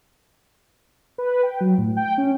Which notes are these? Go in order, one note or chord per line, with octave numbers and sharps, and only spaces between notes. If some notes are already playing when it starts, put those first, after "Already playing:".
B4
G5
F#3
A2
G5
C#4